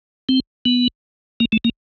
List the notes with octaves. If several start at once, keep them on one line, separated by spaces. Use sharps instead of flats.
C4
B3
A#3
A3
A#3